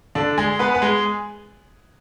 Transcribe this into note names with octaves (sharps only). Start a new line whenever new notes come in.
D3 D4
G#3 G#4
B3 B4
B4
G#3 G#4